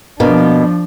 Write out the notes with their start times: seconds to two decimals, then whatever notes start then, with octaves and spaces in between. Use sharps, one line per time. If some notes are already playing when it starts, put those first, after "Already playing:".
0.20 B2 F3 A#3 D4